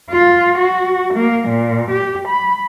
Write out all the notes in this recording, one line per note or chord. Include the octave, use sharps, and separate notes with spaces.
F4
F#4
A#3
A#2
G4
B5